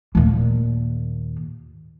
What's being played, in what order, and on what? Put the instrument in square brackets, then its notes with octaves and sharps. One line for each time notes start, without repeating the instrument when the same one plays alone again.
[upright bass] D#2 A#2